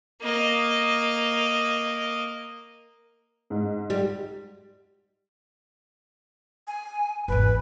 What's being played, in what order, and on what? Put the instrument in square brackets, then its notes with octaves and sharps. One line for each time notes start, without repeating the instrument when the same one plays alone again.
[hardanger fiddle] A#3 D#5
[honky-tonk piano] G#2
[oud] G3
[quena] G#5
[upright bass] G#1 E2 [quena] B4